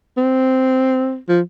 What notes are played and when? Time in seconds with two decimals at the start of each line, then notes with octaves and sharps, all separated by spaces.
0.17 C4
1.28 F3